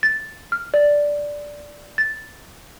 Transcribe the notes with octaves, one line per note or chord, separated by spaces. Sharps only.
A6
F6
D5
A6